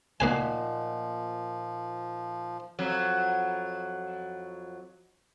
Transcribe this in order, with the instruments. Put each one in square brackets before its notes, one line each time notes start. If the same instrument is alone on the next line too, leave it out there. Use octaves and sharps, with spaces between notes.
[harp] A#2 D#4 F#5 [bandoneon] F3 [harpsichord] A#3 B4 G#5
[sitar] F2 F#3